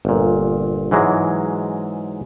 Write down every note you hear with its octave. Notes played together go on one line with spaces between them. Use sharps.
G1 A#2
G#2 E3 F#3 G#3